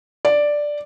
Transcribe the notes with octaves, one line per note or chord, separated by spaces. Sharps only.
D5